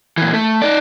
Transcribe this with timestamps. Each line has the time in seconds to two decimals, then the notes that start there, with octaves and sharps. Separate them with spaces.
0.18 A#2 E3
0.34 A3
0.62 D#4 D5